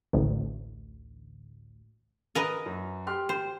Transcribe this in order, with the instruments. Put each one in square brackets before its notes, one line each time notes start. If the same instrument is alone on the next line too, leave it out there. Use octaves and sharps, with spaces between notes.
[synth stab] A1 D2
[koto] A#4 B4 D#5
[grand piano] F#2
G4 C6 F6
[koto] C5